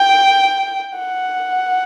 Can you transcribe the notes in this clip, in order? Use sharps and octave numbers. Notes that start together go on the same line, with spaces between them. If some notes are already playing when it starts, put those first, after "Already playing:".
Already playing: G5
F#5